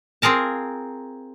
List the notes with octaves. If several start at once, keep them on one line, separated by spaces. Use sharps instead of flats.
C4 F4 G#4 A#4 A5